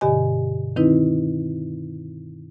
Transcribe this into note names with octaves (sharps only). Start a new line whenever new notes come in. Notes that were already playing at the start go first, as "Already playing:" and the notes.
G2 B2 D3 G4 D#5 G#5
D#3 C4 D#4 E4 B4